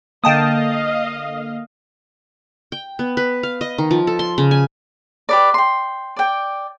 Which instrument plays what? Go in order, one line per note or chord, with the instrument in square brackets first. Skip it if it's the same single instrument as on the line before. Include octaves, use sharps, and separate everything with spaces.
[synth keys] D3 A#3 [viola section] D#5 F5 [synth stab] G5 A5 D#6
[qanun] G5
B3
B4
F5
D#5
D#3
F3
A4
C6
C#3
G#5
[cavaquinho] G4 B4 D5
G5 C6
D5 G5